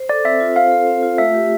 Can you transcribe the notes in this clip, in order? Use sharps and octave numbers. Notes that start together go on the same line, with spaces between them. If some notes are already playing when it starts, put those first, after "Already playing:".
Already playing: C5
A4 D5
C4 E5
F4
C5 F5
A4
C4
F4
A3 E5
G4